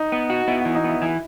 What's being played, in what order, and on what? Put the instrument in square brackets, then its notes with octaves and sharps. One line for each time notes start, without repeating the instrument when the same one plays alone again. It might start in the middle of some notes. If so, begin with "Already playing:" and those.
Already playing: [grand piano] D#4
[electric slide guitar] B3
F#4
[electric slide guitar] B3 [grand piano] E4
[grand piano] F#4
[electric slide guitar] E3
[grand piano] D#4
[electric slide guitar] B3 [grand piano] E4
[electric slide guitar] E3 [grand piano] E4